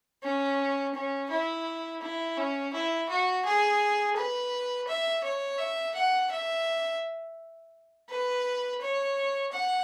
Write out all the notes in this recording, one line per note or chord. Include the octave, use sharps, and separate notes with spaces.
C#4
C#4
E4
E4
C#4
E4
F#4
G#4
B4
E5
C#5
E5
F#5
E5
B4
C#5
F#5